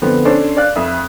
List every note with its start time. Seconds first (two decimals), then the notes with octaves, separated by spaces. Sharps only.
0.02 D3 F3 B3 C4
0.25 C#4 D4 A4 C5 D5
0.57 D5 F5 F#6
0.76 F2 E5 D#6